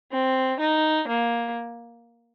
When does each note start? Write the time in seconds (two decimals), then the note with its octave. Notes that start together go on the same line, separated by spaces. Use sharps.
0.11 C4
0.60 D#4
1.08 A#3